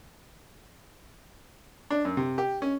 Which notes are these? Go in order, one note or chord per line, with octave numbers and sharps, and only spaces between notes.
D4
F#2
C3
G4
C#4